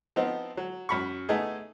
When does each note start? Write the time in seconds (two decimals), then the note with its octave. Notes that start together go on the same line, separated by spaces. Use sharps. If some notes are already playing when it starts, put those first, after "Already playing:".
0.16 F3 B3 C4 D#4
0.57 F#3
0.89 F#2 B5 C#6
1.29 A3 B3 D#4 G#4